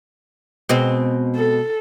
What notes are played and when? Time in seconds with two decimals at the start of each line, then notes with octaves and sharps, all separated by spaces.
0.69 B2 G#3 C4
1.36 A4